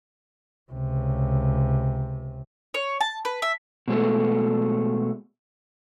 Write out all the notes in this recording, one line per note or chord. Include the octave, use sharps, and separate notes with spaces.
C#2 C3
C#5
A5
B4
E5
B2 G#3 A3